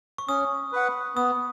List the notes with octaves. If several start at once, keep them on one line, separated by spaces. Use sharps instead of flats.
C#6
C#4 D#6
B4 F#5
B3 D#6